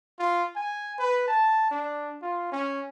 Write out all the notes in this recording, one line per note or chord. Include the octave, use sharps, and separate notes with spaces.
F4
G#5
B4
A5
D4
F4
C#4